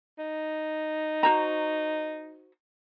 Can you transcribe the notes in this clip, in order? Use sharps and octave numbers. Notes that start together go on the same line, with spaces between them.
D#4
F#4 C5 A#5